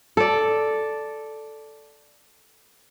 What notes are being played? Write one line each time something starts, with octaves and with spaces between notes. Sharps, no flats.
A4 D5